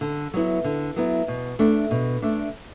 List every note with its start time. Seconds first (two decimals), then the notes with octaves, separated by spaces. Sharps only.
0.01 D3
0.34 F#3 B3 E4
0.64 D3
0.96 F#3 B3 E4
1.28 B2
1.59 A3 D4
1.91 B2
2.22 A3 D4